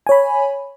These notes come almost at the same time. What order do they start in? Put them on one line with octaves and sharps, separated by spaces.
G#5 C#5 B5